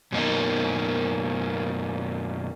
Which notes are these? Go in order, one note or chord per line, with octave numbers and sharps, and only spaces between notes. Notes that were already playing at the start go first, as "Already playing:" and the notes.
F#2 B2 A#3 D#4